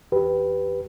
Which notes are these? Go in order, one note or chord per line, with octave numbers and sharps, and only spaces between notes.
E2 G4 B4